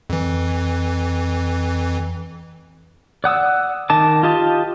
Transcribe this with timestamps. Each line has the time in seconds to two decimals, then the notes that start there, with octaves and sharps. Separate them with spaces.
0.10 F2 E3
3.24 D5 F#5 D#6 E6
3.90 D#3 D#5 A5 D6
4.23 F4 G4 D#5 A5